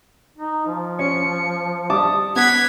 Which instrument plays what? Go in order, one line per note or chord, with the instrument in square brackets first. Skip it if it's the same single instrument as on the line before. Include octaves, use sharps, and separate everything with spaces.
[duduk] D#4
F3
[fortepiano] C#4 [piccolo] C#7
[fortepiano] G3 A5 D6 [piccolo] D#6
[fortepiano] B3 [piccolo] F#5 [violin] G#6 B6